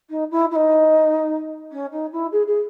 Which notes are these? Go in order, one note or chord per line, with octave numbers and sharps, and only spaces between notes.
D#4
E4
E4
D#4
C#4
D#4
E4
G#4
G#4